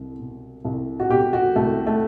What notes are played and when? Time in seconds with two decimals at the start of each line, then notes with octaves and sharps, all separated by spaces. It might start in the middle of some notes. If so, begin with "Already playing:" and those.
Already playing: C2
0.19 B2
0.65 C2
1.00 F#4
1.10 B2 G4
1.33 F#4
1.56 C2 A3
1.87 A3